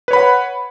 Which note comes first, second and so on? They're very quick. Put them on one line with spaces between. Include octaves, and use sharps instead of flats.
B4 C#5 B5 F#5